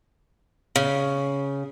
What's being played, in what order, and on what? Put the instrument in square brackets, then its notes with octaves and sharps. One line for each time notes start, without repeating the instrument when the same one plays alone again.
[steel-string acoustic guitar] C#3